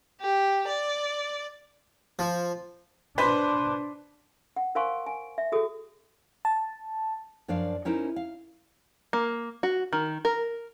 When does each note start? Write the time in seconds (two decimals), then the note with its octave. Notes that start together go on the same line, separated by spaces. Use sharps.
0.21 G4
0.69 D5
2.19 F3
3.18 D4 B4 C5 B6
4.56 F#5
4.75 A#4 C5 F5 G#5 C6 C#6
5.07 G#5
5.38 E5
5.52 F#4 G#4 A4 D#6
6.45 A5
7.48 F#2 F3 D4 D5 F5
7.85 C#4 D#4 E4 A#4 C5
8.16 F5
9.13 A#3
9.63 F#4
9.93 D#3
10.25 A#4